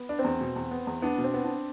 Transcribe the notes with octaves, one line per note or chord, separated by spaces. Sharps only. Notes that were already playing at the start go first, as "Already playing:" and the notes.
Already playing: B3
D4
C4
E2
B2
E2
B3
E2
B3 D4
B2
C4
B3
D4